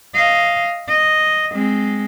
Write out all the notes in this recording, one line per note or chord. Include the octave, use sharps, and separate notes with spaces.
D#5 F5
D#5
G#3 C4